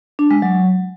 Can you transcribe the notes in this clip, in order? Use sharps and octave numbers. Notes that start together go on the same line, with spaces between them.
D4
G#3
F#3